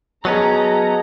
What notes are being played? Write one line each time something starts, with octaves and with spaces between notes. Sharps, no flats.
F#3 B3 C#4 G#4 D#5 A5 A#5